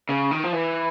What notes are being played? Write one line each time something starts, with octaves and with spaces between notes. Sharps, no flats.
C#3
D#3
F3
E3